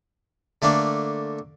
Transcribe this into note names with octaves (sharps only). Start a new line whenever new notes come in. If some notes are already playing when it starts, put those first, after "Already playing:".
D3 A3 A#3 D4